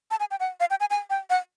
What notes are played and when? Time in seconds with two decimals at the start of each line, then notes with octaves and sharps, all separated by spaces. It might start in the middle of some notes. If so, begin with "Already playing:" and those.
0.11 A5
0.20 G#5
0.31 G5
0.40 F#5
0.60 F5
0.70 G5
0.80 G#5
0.90 G#5
1.10 G5
1.30 F#5